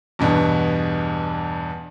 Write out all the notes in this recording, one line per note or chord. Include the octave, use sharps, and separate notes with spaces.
E2 G2 B2